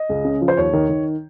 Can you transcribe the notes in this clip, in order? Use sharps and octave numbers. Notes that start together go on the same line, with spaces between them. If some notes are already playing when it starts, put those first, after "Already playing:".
Already playing: D#5
C#2
C#3
F3
C5
D#2 C#5
D#3
D#3